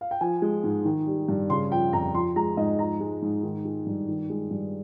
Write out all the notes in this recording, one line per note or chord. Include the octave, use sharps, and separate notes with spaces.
F5
G5
F3 G#5
G#3
G#2
D#3
G3
G2
C#3 C6
F3 G5
F2 A#5
F3 C6
G#3 A#5
G#2 D#5
F3 A#5
G#3
G#2
D#3
G#3
G2
D#3
G#3
G2